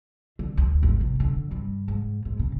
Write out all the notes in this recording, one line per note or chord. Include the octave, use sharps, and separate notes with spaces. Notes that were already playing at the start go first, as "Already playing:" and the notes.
D3
D2
G#1
C3
D3
G2
G#2
G#2
C#3